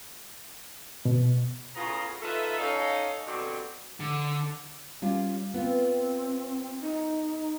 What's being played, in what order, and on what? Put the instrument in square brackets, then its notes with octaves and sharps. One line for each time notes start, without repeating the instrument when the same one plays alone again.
[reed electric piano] B2
[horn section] A2 C#3 B3 F4 G#4 A#5
D#4 F4 A4 B4 E5
C#4 D#4 A4 D#5 F5
G2 B2 D3 F#3 C4
[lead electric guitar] D3
[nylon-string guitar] G3 C#4 F4
[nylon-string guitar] B3 F4 [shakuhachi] C4
[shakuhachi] D#4